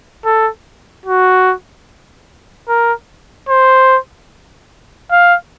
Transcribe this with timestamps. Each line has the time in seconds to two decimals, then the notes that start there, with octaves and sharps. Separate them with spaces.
0.25 A4
1.06 F#4
2.68 A#4
3.49 C5
5.11 F5